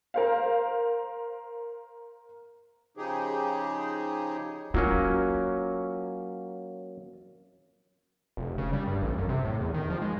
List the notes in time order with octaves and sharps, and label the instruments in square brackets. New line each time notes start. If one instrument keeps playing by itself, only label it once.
[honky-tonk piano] A#4 C5 F5
[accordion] C#3 F3 D#4 G4 G#4
[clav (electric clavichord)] F#3 A#3 C#4 [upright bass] F4
[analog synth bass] F1
C#3
G3
G2
A1
F#2
C3
A2
E2
D#3
F3
G#3